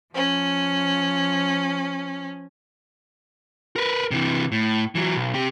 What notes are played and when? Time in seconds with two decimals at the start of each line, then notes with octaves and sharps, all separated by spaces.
0.14 F3 C#4
3.76 A#4 B4
4.11 C3 E3
4.52 A2
4.95 E3 F#3
5.15 B1
5.34 C3 G4